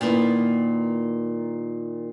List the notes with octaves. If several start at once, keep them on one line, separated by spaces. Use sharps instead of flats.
A#2 D#3 A#3 B3 E4